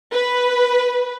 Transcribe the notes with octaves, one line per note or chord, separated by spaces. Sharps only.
B4